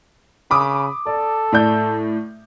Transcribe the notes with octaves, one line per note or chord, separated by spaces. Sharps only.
C#3 B5 D6 D#6
A4 D5
A2 D5 G6